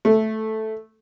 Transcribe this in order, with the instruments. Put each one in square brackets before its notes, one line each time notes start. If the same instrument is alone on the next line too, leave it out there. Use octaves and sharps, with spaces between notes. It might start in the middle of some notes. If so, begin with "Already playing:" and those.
[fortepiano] A3